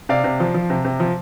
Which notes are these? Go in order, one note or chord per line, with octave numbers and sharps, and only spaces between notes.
C3 D5 F5
C3
F3
F3
C3
C3
F3